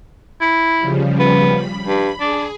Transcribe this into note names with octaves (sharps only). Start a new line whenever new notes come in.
E4
C#3 F3 G3
B3
B5
G2
D4 G#4